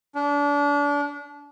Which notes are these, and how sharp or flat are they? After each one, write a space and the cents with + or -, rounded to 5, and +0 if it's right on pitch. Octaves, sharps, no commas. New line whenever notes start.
D4 -30